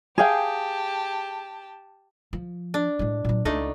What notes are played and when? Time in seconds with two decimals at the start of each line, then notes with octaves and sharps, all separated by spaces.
0.18 G4 G#4 F5 G5 A5
2.33 F3
2.74 D4
2.99 A2 G#3
3.25 A#2 F#3
3.45 C#2 A3 D4 D#4